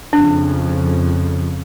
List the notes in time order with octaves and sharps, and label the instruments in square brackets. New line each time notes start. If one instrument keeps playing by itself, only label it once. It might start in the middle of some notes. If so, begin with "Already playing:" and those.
[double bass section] F2 C#3 F3 [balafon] D4